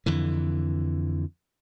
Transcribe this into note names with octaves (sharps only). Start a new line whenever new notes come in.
F2 D3 E3